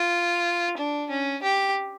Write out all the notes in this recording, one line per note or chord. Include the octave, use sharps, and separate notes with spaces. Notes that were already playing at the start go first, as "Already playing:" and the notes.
Already playing: F4
D4
C#4
G4